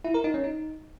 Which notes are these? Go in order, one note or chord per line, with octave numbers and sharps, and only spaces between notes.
E4
A#4
D#4
C#4
D#4